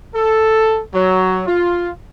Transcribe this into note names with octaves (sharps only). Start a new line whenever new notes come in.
A4
F#3
F4